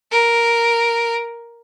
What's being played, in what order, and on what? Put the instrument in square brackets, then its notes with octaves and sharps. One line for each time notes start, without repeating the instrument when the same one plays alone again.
[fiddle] A#4